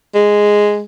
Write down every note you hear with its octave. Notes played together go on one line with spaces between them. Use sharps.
G#3